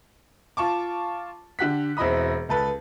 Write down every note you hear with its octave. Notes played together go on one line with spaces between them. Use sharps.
F4 A5 C#6 D6
D3 G4 F#5 F#6 B6
E1 C4 E4 D#5 B5 D#6
C#2 A4 B4